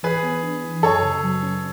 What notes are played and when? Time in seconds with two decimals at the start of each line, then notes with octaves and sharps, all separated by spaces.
0.03 E3 G#4 B4
0.23 B3
0.43 D4
0.64 E3
0.83 F#2 A4 C#5
1.03 C#3
1.24 F#3
1.43 C#4